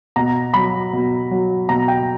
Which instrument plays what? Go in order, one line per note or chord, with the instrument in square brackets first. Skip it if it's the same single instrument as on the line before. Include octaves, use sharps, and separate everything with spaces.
[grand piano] B2 A#5
F#3 B5
B2
F#3
B2 A#5
G5